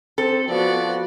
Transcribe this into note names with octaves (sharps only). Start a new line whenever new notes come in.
C4 A4
F3 B3 F#4 D5